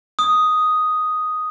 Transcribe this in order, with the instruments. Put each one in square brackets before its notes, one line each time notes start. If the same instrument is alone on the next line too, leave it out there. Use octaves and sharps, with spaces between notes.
[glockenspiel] D#6